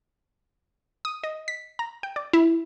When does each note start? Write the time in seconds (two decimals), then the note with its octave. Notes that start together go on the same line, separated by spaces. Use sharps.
1.05 D#6
1.24 D#5
1.48 B6
1.79 A#5
2.03 G5
2.16 D5
2.33 E4